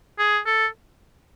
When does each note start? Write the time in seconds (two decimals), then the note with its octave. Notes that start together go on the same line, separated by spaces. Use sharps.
0.19 G#4
0.46 A4